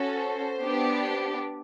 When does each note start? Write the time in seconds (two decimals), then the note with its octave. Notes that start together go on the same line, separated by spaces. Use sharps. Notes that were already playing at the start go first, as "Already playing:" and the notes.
Already playing: C#4 F#4 A4
0.15 C5
0.61 B3 D4 G4